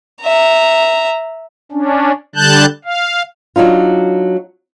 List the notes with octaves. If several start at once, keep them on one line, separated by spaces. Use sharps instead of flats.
E5 A#5
C#4 D4
D3 G3 A5 F#6 G6
F5
F#3 D4 D#4 F4